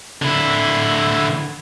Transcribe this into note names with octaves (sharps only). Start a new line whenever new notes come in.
D3 E4